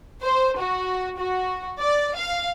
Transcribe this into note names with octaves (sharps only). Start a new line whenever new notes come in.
C5
F#4
F#4
D5
F5